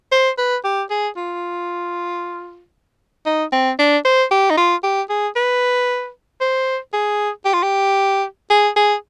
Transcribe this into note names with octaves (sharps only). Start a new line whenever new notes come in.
C5
B4
G4
G#4
F4
D#4
C4
D4
C5
G4
D#4
F4
G4
G#4
B4
C5
G#4
G4
F4
G4
G#4
G#4